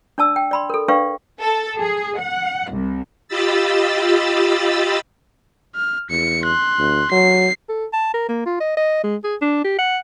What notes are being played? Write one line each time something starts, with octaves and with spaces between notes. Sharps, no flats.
D4 D5 A5 E6
G5
D5 B5 C6
A4 A#4
D4 B4 D5 F5 G5 C#6
A4
G#4
F#5
C2
F4 G4 D#5 B5 E6 A6
F6
E2 C#7
C6 F#6
D2
F#3 C7
A4
A5
A#4
A#3
F4
D#5
D#5
G#3
G#4
D4
G4
F#5